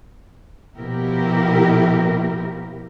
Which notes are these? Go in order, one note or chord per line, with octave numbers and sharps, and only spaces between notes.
B2 F3 E4 G4 A#4